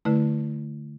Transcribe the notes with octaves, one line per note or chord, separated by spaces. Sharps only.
D3 A3 E4 B4